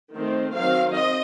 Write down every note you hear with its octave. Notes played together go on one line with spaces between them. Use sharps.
D#3 A3 C4
D#3 F#3 C4 F5
C4 D#5